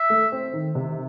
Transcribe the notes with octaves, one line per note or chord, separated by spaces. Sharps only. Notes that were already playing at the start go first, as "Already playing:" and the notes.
Already playing: E5
A3
C4
D#3
C3